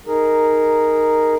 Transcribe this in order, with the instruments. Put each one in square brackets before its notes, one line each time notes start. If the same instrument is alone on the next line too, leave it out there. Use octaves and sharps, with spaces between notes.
[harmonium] D#4 G#4 A#4